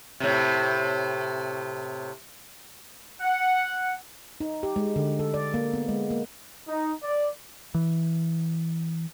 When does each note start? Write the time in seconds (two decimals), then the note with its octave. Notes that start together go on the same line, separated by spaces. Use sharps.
0.20 A2 C3
3.21 F#5
4.40 D#4
4.63 G4
4.76 G#3
4.96 D3
5.19 A4
5.34 D5
5.54 A#3
5.74 B3
5.89 G#3
6.10 A#3
6.68 D#4
7.04 D5
7.75 E3